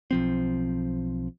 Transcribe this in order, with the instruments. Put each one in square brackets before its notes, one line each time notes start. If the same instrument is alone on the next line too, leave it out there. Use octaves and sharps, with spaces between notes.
[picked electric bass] B1 F3 C4